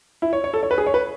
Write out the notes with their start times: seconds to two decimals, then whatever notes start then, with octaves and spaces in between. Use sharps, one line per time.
0.22 E4
0.33 C#5
0.44 C#5
0.54 A4
0.63 C#5
0.71 B4
0.78 G#4
0.86 C#5
0.94 B4